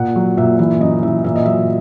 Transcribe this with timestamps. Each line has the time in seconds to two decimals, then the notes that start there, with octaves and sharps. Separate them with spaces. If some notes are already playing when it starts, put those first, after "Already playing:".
Already playing: A#2 F#5
0.16 F#3
0.37 A#2 E5
0.59 E3 E5
0.81 F#2 D#5
1.03 E3 E5
1.24 A#2 E5
1.36 D#5
1.46 F#3 E5